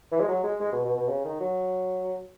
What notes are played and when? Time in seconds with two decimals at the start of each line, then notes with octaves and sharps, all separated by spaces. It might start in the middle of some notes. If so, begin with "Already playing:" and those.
0.12 E3
0.20 G#3
0.28 F#3
0.44 G#3
0.60 G#3
0.72 B2
0.85 B2
0.97 B2
1.09 C#3
1.25 D#3
1.40 F#3